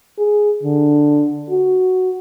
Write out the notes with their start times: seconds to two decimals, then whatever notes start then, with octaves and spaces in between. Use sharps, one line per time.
0.18 G#4
0.63 D3
1.50 F#4